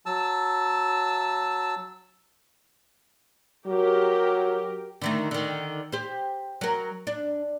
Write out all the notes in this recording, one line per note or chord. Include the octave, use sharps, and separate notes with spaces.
F#3 A5 E6
F#3 G4 A#4
D3 D#3 A3
D3 D#3
G4 C5
F#3 A#4
D4